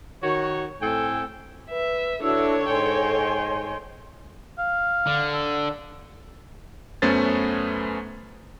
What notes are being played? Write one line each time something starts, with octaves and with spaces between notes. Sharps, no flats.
D#3 F#4 C#5
A2 A3 C4 A4 G5 G#5
B4 E5
D3 D4 E4 F#4 A4 C#5 E6
G#2 D#5 G5 G#5 C6
F5
D3
A4
F#2 A3 B3 C#4 C5 A6